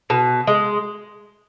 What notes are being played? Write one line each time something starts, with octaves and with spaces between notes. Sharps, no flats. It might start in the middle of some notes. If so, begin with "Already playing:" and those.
B2
G#3